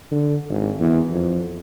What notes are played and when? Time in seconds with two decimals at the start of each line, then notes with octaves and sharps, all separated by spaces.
0.11 D3
0.49 G#1
0.80 E2
1.11 F2